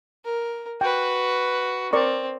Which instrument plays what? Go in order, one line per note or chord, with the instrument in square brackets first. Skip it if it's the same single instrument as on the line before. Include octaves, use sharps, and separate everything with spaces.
[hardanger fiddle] A#4
[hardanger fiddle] F#4 B4 [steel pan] G5
[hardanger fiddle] C4 [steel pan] A#4 D5 C#6